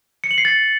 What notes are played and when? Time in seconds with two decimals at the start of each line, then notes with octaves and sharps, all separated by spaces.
0.24 C#7
0.31 F#7
0.38 C7
0.45 A6